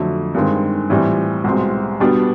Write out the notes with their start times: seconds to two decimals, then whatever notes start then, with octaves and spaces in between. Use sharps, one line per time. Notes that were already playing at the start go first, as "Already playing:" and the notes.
Already playing: F2 D3 F#3 A3
0.34 G2 D#3 G#3 C4
0.90 A2 E3 G3 C4
1.44 C2 B2 G#3 C4
2.00 B2 G3 B3 D4